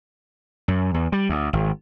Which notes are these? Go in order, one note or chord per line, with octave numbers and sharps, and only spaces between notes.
F#2
E2
G3
D2
G#1